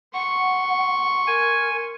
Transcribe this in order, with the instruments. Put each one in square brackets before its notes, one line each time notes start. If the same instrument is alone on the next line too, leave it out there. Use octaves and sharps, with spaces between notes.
[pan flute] F#5 [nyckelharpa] C6 C#6
[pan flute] A#4 [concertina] G#5